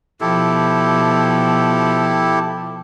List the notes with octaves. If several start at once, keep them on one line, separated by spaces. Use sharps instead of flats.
B2 F3 E4 G4 A4